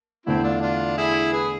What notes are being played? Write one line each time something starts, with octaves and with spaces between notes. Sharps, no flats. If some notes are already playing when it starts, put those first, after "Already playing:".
E2 D3 A3 C4 E4
D4 F4
D4 F4
E4 G#4
G#4 B4